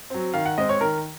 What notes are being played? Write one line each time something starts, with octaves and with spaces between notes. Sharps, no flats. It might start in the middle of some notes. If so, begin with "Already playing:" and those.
F#3 C4
D#3 F5
F#5
G#3 C4 D#5
C#5
D#3 A#4